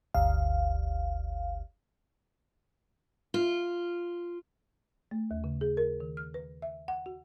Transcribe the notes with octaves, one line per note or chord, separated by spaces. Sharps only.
G1 D2 F5
F4
A3
D#2
C#3
G#4
A#4
D#3
F6
B4
E5
F#5
F#4